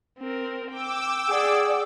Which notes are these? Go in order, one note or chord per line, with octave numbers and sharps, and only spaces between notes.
C4 A#4
G5 D6 E6
G#4 D5 F#5